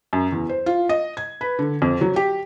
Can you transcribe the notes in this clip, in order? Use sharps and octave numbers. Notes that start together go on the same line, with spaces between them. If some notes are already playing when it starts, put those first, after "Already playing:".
F#2
E2
C5
F4
D#5
G#6
B4
D3
F2
F#3
G4